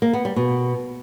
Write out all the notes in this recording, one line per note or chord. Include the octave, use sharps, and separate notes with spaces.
A#3
B3
G3
B2